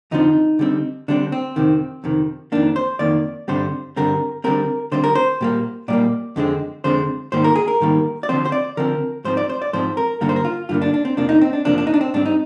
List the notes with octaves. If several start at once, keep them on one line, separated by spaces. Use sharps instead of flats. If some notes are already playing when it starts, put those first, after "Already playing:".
F2 D3 F3 C4 D#4
D3 G3 C4
D3 G3 C4 D4
C4
F2 C3 D#3
F2 C3 D#3
F2 D#3 A#3 D4
C5
F2 D#3 A#3 D5
G2 D3 G3 C4 C5
G2 D3 G3 C4 A#4
D3 G3 C4 A#4
D3 G3 C4 C5
A#4
C5
A#2 G3 A#3
A#2 G3 A#3 D5
F2 D3 G#3 C4
F2 D3 G#3 C4 C5
G#2 D#3 G3 A#3 C5
A#4
G#4
A#4
G#2 D#3 G3 A#3
D5
D3 F3 C4 C5
C5
D5
D3 F3 C4 A#4
G#2 F3 C4 C5
D5
C5
D5
G#2 F3 C4 C5
A#4
G2 D3 G3 A#3 A#4
C5
A#4
F4
G2 D3 G3 A#3 F4
D4
D4
C4
F2 C3 F3 A#3 D4
D#4
C4
D4
F2 C3 F3 A#3 D4
D4
D#4
D4
C4
G#2 G3 C4 D4
D#4